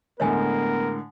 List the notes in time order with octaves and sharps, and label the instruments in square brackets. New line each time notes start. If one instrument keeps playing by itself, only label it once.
[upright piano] A2 D3 G#3 [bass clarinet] B3 [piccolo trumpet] A#4 [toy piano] C#5 E5 G#5